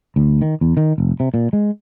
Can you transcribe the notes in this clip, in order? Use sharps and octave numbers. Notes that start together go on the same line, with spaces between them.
D2
D#3
E2
D#3
F1
C3
A#2
G#3